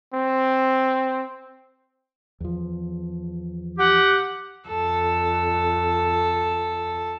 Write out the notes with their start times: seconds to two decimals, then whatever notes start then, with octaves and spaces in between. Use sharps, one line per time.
0.14 C4
2.40 E2 F3
3.78 G4 F#5
4.68 F2 A4